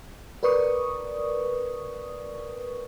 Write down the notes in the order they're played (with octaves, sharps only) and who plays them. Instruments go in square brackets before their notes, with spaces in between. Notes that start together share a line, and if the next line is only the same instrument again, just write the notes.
[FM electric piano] A#4 B4 D5 C#6 D#6